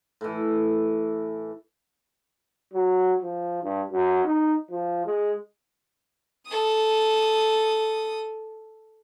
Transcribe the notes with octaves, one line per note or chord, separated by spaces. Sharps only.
A2 E3
F#3
F3
G2
F#2
D#4
F3
G#3
A4 D#6